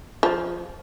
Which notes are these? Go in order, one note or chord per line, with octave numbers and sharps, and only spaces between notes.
F3